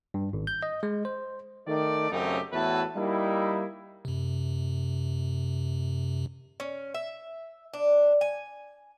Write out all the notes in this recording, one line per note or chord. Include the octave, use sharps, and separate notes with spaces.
G2
G#1
G6
D#5
G#3
C5
D#3 A3 D5
F#2 C#3 A3 C4 D#4 G4
E2 A2 E4 F#4 B4 A5
G3 A#3 D#4 E4
F#2 C3
C#4
E5
D4
G#5